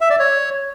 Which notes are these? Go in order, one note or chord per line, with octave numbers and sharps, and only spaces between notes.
E5
D5
C#5